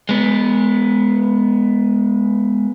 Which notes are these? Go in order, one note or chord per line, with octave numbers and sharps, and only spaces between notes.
G#3 B3